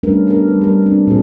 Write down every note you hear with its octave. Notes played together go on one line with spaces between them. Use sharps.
G3 A3 C#4 D4 A#4 B4
B3 D4 G4 A4 A#4
G3 B4
G3 A#4
C4 D4
A#2 C4 G#4